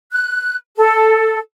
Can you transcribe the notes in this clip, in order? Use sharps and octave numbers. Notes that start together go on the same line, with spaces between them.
F#6
A4